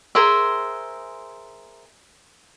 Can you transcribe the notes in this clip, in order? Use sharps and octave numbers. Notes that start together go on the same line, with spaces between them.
G#4 A#4 C5 E5